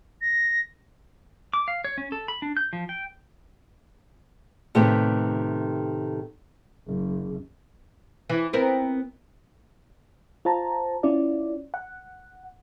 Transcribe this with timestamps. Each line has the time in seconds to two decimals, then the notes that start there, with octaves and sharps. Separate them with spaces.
0.21 A#6
1.54 D6
1.68 F5
1.84 C#5
1.98 C#4
2.12 A4
2.28 B5
2.42 D4
2.57 G6
2.73 F3
2.89 G5
4.75 A2 C3 D#3 A3 B3 G4
6.87 F#1
8.30 E3
8.53 B3 C4 A#4
10.45 F4 C5 A5 A#5
11.03 C#4 E4 F4 D5
11.74 F#5